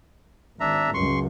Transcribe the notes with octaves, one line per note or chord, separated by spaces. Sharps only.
G#1 D4 E5 A#5
C#2 F#2 C6 C#6